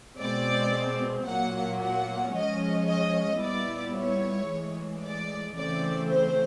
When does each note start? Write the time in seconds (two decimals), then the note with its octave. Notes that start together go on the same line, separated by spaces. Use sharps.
0.18 B2 G#3 C4 D5
1.26 A#2 F#3 A#3 F#5
1.80 F#5
2.33 F3 G#3 C#4 D#5
2.87 D#5
3.41 A#2 G3 B3 E4 D5
3.94 C#5
4.48 A2 E3 G#3
5.01 D5
5.56 C#3 E3 A3 C4 D5
6.09 C5